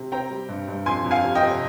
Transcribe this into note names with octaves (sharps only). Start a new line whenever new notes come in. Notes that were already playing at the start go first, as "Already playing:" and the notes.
Already playing: C3
C4 G5 A#5
G3
G2
G2
F2 G#5 C6
F2
F5 G#5
C3
D#5 G5
C3